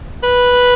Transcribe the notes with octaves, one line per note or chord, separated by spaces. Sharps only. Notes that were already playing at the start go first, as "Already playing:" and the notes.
B4